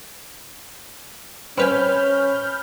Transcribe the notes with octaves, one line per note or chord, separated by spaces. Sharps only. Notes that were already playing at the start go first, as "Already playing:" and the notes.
C4 C#4 B4 G#5 B5 F6 G6